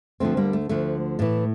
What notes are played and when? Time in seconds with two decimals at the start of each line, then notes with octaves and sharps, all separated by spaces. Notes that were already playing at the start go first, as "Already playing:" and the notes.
0.20 D2 D3 F3 A3 C4
0.37 G3 A#3
0.53 A3
0.69 D2 D3 F3 A3
1.19 A2 E3 A3